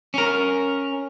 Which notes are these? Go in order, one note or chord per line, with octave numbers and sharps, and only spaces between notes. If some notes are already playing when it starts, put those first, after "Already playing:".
C#4 A#4